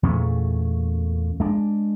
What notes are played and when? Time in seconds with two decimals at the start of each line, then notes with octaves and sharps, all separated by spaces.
0.03 E2 A#2 A3 C#4
1.40 G#3 D4